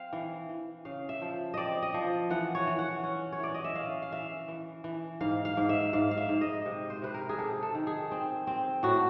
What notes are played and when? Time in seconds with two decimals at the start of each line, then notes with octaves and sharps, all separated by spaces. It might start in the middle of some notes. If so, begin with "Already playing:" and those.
Already playing: C4 F5
0.13 E3
0.49 E3
0.85 C#3 F5
1.09 E5
1.22 F3
1.54 C4 D5 D#5
1.82 D#5
1.94 F3
2.30 E3 F#5
2.55 C#5
2.67 E3
2.79 F#5
3.04 C#4
3.32 C#5
3.40 E3 D5
3.54 D#5
3.64 E5
3.75 C#4 F5
4.02 F5
4.12 E3 E5
4.48 E3
4.84 E3
5.21 G#2 F5
5.45 F5
5.57 G#2
5.69 E5
5.93 G#2 F5
6.11 F5
6.17 E5
6.29 G#2
6.41 D#5
6.66 C3
6.90 C5
7.02 C3 B4
7.14 A#4
7.29 G#4
7.38 C3 A4
7.63 A4
7.75 D#3
7.87 G#4
8.11 C4
8.47 C4
8.83 A2 F#4